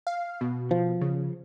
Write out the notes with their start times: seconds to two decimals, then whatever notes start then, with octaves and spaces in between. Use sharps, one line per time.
0.07 F5
0.41 B2
0.71 F3
1.01 C#3